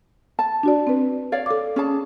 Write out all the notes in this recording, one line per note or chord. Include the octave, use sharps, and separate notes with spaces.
A5
D4 F#4 D5
C4 B4
C#5 D5 F5
A4 D6
C#4 G#4 A5